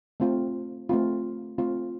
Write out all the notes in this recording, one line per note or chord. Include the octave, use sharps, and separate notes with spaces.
A3 C4 F4
A3 C4 F4
A3 C4 F4